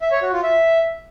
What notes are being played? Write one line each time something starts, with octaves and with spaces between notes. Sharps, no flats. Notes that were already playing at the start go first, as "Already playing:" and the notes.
E5
C#5
F#4
F4
E5